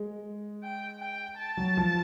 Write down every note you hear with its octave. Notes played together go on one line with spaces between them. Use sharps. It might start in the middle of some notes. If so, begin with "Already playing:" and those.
Already playing: G#3
G5
G5
A5
F#3
F3